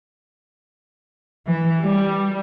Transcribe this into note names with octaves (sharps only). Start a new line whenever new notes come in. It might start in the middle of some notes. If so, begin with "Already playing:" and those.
E3
G3